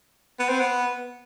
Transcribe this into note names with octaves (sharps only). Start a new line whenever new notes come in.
B3
C4
B3